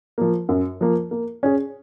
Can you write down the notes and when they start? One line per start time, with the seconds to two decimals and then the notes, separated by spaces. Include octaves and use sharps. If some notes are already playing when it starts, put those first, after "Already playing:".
0.18 F3 A#3
0.49 F#2
0.81 F3 A#3
1.11 A#3
1.43 C#4 G#4